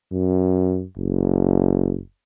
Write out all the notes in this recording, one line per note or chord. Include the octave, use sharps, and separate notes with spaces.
F#2
F#1